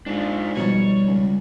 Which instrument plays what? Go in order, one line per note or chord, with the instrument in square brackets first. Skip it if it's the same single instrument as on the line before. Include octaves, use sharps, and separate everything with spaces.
[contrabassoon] G#2 [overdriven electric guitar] D4 F4
[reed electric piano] B2 F3 D#4 [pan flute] G3 [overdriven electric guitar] C#5
[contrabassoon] C#2